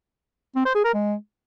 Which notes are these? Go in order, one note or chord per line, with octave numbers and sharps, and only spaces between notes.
C4
C5
G#4
A#4
G#3